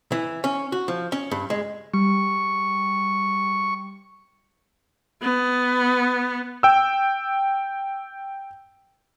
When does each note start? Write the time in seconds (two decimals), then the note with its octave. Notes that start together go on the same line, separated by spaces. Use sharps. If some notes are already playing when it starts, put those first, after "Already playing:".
0.12 E3
0.44 C#4
0.72 F#4
0.88 F3
1.12 C#4
1.31 G2
1.50 G#3
1.94 G3 C#6
5.22 B3
6.63 G5 E6